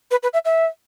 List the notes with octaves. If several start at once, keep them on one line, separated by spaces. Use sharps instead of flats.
B4
B4
E5
E5